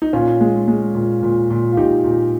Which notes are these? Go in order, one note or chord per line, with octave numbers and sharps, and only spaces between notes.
D#4
A#2 C#4 F4
G#3
G#3
A#2
A#2
A#2
F4
A#2 D#4 G4
A#2